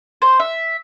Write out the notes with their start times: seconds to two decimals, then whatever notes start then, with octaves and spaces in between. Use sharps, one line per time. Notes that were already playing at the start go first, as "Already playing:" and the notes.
0.22 C5
0.40 E5